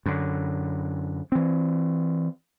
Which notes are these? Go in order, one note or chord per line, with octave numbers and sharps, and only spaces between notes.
F#2 D3
E3 C4